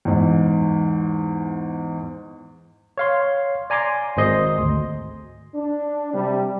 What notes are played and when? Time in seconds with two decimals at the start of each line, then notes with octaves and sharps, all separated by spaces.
0.05 E2 G#2
2.98 C#5 F5 C6
3.70 D5 G#5 A#5 C6 D6
4.17 G#1 C5 D#5 C6
4.59 D2
5.55 D4
6.14 C3 G3